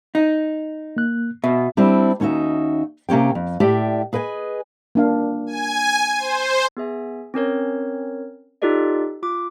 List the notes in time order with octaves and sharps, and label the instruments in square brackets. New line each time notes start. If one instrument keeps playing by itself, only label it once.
[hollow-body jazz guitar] D#4
[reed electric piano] A#3 F#6
[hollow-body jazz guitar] B2 [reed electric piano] E5
[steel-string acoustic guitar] G3 C4 D4 E4
D#2 C#4 D#4 F#4 E5
C3 A#3 C#4 G4 G5
F2
A2 G4 D5 E5 G5
G#4 B4 D#5 G5 G#5
[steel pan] A#3 D4 F5
[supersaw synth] G#5
C5
[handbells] B3 G#4 E5 G#5
C4 C#4 A#4 C#5
D#4 F4 G4 A4 D5 D#5
F4 D6